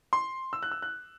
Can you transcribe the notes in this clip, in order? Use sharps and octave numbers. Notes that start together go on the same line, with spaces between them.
C6
E6
F#6
E6
F#6